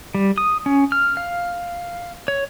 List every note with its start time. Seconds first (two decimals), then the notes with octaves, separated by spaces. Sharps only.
0.15 G3
0.38 D#6
0.66 C#4
0.92 F6
1.17 F5
2.28 C#5